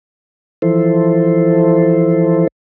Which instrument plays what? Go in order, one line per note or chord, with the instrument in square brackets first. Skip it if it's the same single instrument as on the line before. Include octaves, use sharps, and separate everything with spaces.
[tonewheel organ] E3 F3 E4 A4 C5